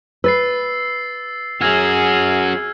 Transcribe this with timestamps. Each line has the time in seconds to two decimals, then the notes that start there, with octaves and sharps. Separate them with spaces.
0.24 B4 E6 A6 C7
1.61 C#4 F#4 G#4 E6 F6 G#6